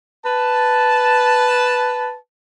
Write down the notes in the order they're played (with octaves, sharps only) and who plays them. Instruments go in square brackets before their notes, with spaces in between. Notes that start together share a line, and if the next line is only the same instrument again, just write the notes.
[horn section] B4 A5